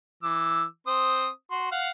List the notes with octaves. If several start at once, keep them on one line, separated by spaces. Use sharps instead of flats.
E3 D6 E6
C4 C5 D#6
F#4 C6
F5 F#5